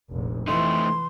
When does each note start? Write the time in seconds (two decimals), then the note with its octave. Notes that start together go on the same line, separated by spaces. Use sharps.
0.12 F1 A#1
0.48 E3 A3 D#4 C6